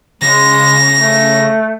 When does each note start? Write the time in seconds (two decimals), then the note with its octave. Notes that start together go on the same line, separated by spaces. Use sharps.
0.22 C#3 G#3 A#6
0.96 A3